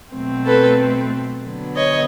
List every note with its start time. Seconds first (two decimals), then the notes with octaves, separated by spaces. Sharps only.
0.13 B2 F#3 A3 C4
0.46 A4 B4
1.44 D3 F#3 B3
1.76 C#5 D#5